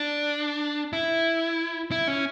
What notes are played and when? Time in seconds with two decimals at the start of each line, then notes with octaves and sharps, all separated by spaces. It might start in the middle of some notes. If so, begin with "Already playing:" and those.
Already playing: D4
0.93 E4
1.91 E4
2.08 C#4